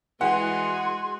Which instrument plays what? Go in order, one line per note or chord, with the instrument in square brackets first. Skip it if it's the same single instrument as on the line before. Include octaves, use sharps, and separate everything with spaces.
[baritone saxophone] E3 [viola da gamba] G#3 F#4 G#4 [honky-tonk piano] F#5 [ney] C6